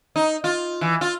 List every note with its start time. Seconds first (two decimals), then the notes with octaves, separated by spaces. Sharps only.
0.16 D#4
0.44 F4
0.81 E3
1.01 F4